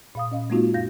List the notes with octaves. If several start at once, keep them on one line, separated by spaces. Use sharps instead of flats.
A#2 F5 D#6
C#4 D#5 F5
G#3 A#3 C4 D#4 F4 F#4
F#2 F5 G6 A#6